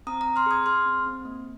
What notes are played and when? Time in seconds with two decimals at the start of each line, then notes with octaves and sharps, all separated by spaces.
0.07 C4 A#5 D#6
0.21 A#5 D#6
0.27 C4
0.36 C6 F6
0.46 G#4 D#6 G#6
0.66 G#4 C6 F6
0.86 C4
1.06 C4
1.25 A#3